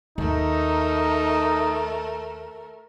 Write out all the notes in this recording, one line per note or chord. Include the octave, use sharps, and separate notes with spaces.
D#2 A3 D#4 A#4